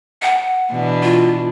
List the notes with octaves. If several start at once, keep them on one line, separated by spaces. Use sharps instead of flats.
F#5
B2 E3 D4
F4